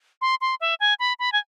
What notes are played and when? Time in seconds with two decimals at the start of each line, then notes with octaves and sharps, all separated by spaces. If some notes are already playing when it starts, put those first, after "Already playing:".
0.21 C6
0.41 C6
0.61 E5
0.80 G#5
1.00 B5
1.19 B5
1.32 G#5